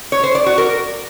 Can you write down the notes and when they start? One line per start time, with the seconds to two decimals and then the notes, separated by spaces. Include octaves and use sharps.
0.12 C#5
0.24 C5
0.35 D5
0.46 F#4
0.58 A#4